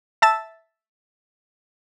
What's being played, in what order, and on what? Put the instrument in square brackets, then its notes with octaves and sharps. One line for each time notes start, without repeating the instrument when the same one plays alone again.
[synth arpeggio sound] E5 A5 A6 E7